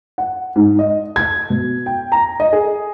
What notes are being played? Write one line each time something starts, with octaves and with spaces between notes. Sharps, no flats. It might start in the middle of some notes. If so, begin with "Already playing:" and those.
F#5
G#2
D#5
G#6
B2
G5
A#5
D#5
G#4